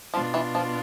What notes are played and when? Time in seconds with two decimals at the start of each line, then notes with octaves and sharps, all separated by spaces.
0.13 B2 F3 B3 D4 F4
0.34 E3
0.55 F3